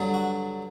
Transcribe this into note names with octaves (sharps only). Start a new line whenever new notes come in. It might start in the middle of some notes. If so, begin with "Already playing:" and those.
Already playing: G2 D3 F#3
F#4